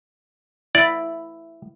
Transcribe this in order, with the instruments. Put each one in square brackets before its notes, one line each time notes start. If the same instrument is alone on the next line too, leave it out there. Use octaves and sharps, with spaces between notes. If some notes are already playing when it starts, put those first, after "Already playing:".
[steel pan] E4 [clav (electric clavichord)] D5